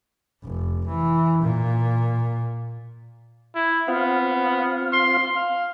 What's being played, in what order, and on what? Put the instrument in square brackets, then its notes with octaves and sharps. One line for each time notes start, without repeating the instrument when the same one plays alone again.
[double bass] F1
E3
A#2
[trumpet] E4
[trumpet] B3 [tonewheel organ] C4 F4 F5
[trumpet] C6
F5